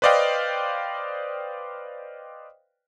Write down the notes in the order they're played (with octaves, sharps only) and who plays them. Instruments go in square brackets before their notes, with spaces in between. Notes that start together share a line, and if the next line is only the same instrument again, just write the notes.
[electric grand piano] B4 C5 D5 D#5 F5 G5